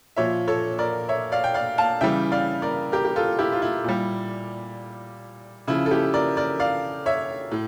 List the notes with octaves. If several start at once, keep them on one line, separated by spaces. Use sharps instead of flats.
A#2 F3 C#5 E5
A4 C#5
A#4 D5
C#5 E5
D5 F5
G5
D5 F5
F5 A5
C#3 E3 G3 E5 G5
D5 F5
A#4 D5
G4 A#4
G4
F4 A4
E4 G4
F4
E4
A#2 G3
C#3 F3 E4
A4
E4 G4
A#4 D5
A#4 D5
D5 F5
C#5 E5
A2